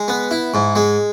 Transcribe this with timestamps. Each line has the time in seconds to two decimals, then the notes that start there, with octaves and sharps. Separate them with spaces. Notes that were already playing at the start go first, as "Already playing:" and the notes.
Already playing: G#3
0.08 B3
0.31 E4
0.54 G#2
0.75 G#3